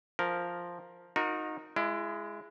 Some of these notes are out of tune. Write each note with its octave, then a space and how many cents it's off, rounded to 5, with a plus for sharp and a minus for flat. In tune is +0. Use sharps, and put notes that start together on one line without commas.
F3 +0 A#4 +0
D#4 +0 F#4 -40 A#4 +0
G#3 +0 E4 +30